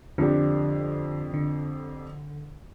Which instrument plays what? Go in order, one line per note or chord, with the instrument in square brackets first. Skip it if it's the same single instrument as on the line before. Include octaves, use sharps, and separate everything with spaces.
[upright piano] F2 F3 D4 G4 [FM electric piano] D3
[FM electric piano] D3